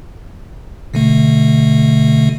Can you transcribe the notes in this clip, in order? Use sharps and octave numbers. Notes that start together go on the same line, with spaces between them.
B2 D3 A3